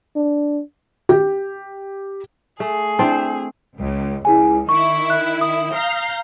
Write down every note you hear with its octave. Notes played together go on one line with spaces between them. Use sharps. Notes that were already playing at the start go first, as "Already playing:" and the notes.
D4
G4
A3 G#4
C4 D4 E4 C5 A5
C#2
C#2 E4 G#4 G#5
D#3 E4 C#6
F#6
D#6
F5 A#5 G6